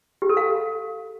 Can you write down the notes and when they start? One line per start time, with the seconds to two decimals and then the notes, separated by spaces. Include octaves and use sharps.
0.22 G4
0.29 A4
0.37 F5